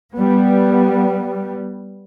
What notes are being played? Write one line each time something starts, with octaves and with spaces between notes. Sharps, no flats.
G3 B3